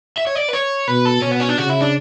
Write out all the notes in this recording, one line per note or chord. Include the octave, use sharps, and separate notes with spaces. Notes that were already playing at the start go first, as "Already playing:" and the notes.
E5
C#5
D5
B4
C#5
B2 B4
A4
B2 C#4
B3
C#4
D4
C#3 F#4
E4
D4